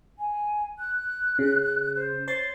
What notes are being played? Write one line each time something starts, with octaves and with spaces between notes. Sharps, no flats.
G#5
F#6
C#3
C5
C5 C#5 C6 A6